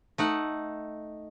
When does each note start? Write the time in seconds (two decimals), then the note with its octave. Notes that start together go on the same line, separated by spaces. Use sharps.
0.18 A3 D#4 F#5